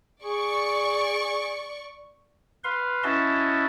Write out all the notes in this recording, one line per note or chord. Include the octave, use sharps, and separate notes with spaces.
G#4 D5 C#6
B4 F5 C6
C#4 E4 F#4 D#5 E5 A5